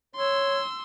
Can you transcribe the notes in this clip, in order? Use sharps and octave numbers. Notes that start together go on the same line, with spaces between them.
C#5 C6 E6